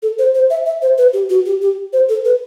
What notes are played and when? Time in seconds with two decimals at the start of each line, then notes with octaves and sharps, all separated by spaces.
0.03 A4
0.19 C5
0.35 C5
0.50 E5
0.66 E5
0.82 C5
0.98 B4
1.13 G4
1.30 F#4
1.46 G4
1.62 G4
1.93 C5
2.09 A4
2.25 B4